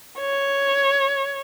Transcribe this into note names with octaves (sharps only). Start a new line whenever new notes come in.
C#5